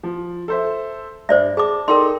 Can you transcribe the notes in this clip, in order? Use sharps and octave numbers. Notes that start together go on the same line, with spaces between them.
F3
A4 C5 E5
G2 C5 D5 E5
G#4 A5 D6
D#4 A4 A#4 D5 G5 C6